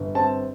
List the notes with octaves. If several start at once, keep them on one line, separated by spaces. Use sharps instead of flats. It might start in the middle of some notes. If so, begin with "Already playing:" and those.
Already playing: G1
C4 A5